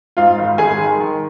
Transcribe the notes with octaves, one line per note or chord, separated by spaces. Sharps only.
G#2 F4 F5
G#1
G#1 G#4 G#5
D#3
D#3